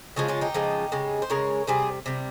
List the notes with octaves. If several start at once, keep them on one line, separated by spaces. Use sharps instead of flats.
C#3 F3 G#3 C#4 F4
C#4 F4
D#4 G4
C#3 F3 G#3
C#3 G#3
C5
C#3 G#3 A#4 C#5
C3 G3 G#4 C5
C3 G3